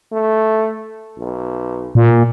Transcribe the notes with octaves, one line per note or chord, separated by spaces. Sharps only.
A3
B1
A#2